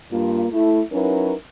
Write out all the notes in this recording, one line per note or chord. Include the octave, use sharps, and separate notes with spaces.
G2 A#3 F4
A3 E4
F#3 C#4 D#4 E4 A#4 B4